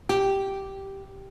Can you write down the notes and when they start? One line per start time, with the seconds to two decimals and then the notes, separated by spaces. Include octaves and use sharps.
0.09 G4